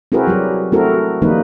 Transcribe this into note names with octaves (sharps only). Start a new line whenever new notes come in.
C4 E4 F#4 G#4 A#4 B4
F#3 G3 G4
A3 C4 E4 F#4 A4 A#4
D#3 F3 G3 A#3 D#4 B4